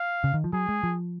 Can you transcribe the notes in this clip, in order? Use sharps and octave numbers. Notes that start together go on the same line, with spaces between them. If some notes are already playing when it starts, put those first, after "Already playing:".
Already playing: F5
C#3
D#3
F3
F#3 G#4
G#3
F3